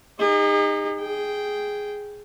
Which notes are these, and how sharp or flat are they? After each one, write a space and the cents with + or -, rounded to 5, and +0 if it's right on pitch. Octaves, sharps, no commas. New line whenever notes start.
D#4 -15 G#4 -45
G#4 +0 G5 -5